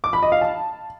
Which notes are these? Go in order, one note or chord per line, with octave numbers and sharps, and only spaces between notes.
D6
B5
D#5
F5
A5